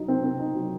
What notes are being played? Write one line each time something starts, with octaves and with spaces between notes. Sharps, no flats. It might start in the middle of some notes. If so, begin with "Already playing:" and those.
Already playing: F#3 D#4
C4
C4
D#4
F#3